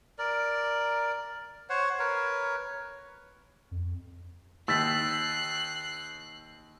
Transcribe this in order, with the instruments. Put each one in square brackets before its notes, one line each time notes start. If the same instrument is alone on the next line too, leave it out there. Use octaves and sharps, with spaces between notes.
[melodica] A#4 D5
C5 C#5 F#5
A#4 B4 C#5
[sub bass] F2
[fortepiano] D#2 [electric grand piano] E6 A6 B6 [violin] F#6 C7